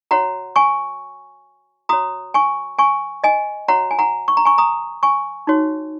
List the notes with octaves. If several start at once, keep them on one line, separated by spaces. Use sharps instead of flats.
F#4 C#5 F#5 A#5
G#5 C#6
F#4 C#5 A#5 D#6
G#5 C#6
G#5 C#6
D#5 G#5
F#4 C#5 F#5 A#5
G#5
F#5 A#5
C#6
A#5
G#5 C#6
A#5 D#6
G#5 C#6
D#4 F#4 C#5